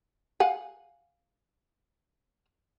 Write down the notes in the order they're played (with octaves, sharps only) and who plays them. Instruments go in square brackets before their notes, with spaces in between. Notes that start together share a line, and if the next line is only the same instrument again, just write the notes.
[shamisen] F5 F#5 G#5